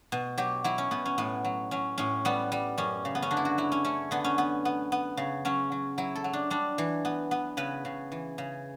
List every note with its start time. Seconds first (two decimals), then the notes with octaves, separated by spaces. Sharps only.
0.12 B2
0.38 F#3 G4
0.64 F#3 E4
0.78 C#4
0.91 B2 B3
1.06 C#4
1.18 A2 B3
1.45 F#3
1.71 F#3 C#4
1.98 A2 C#4
2.25 G3 B3
2.52 G3
2.78 F#2 C#4
3.05 C#3
3.15 B3
3.22 C#4
3.31 D3 D4
3.37 E4
3.45 F#4
3.58 F#3 E4
3.72 C#4
3.85 A3 C#4
4.11 D3 B3
4.24 C#4
4.38 B3
4.65 B3
4.92 B3
5.17 C#3
5.45 F#3 C#4
5.72 F#3
5.98 F#3 E4
6.15 A4
6.24 F#3
6.33 D4
6.50 G3 D4
6.78 E3
7.05 B3
7.31 B3
7.57 C#3 B4
7.85 C#3
8.12 E3
8.38 C#3